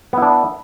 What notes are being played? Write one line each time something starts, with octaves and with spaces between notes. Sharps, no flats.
B3 D4 E4